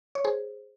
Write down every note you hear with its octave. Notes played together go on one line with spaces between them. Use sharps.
C#5
G#4 C5